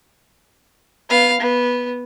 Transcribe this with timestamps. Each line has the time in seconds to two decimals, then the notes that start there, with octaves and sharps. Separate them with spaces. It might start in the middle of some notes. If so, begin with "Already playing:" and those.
1.10 B3 F5
1.41 B3